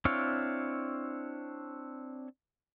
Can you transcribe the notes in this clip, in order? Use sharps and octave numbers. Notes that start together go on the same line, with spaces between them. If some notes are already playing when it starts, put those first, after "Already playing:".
C4 D4 E4 C#5 F5